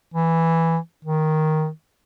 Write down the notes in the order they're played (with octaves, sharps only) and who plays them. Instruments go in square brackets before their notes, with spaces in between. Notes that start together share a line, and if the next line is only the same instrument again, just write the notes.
[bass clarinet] E3
D#3